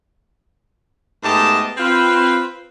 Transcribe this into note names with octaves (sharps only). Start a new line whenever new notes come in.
G#2 A3 B3 G4 D#5 A5
C4 F4 B4